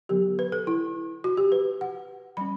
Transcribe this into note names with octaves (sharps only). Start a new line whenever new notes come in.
D3 F#3 B3 G4
B4
A4
E4
F#4
G4
B4
F#5
G3 C#4 B5